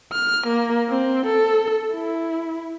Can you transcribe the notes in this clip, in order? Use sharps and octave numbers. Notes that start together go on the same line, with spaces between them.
F6
A#3
C4
A4
E4